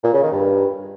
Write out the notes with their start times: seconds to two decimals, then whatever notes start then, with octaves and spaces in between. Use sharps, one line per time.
0.04 A#2
0.13 C#3
0.23 D#3
0.32 G2